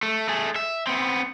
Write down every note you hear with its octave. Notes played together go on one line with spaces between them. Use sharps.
A3
A3 G#4
E5
B3 C4